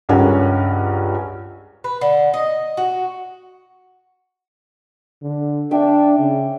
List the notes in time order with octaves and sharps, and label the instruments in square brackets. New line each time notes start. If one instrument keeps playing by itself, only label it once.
[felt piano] C#2 G2 C#4 A#4 F#5
[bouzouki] B4
D3
D#5
F#4
[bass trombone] D3
[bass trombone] D4 [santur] E5 G5
[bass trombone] C#3